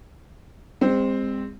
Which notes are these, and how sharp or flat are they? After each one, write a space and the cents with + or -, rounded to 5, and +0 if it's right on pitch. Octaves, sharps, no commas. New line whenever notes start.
G#3 -35 C4 +0